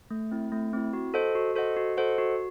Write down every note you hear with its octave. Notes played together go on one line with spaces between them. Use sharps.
A3
C4 E4
A3
C4 E4
F#4
A4 C5 D#5 F#5
F#4
A4 C5 D#5 F#5
F#4
A4 C5 D#5 F#5
F#4